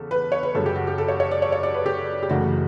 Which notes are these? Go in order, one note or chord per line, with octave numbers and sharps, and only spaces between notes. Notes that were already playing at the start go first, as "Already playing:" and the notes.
Already playing: E2 C#3 A4
B4
C#5
B4
F#2 C#3 G3 A4
G4
F#4
G4
A4
C#5
C#5
D5
C#5
C#5
D5
B4
G4
G4
F#1 F#2 C#3 E3 A3 F#4